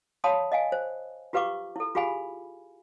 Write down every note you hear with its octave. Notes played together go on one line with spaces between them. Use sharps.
C#5 F5 A5 B5 C6 D#6
D#5 F5 G#5
C5
F4 G4 B4 F5 C#6 D6
E4 A4
F4 G4 G#4 F5 G#5 B5